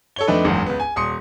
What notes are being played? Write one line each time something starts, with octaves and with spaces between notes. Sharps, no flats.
A4 C#5 G7
F2 A3 D4 D#4 B4
F#1 E2 G#2
C#2 B3
G#5
D#1 C6 D#6 C#7